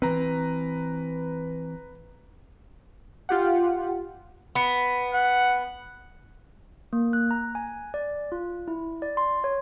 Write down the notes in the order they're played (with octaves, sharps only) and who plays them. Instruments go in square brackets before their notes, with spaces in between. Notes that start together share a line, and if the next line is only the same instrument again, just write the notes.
[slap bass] E3 C4 [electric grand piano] B4 A#5
[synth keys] F4 G4 F#5
[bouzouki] B3
[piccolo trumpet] F#5
[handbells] A#3
F#6
A#5
G#5
D5
F4
E4
D5
C6
C#5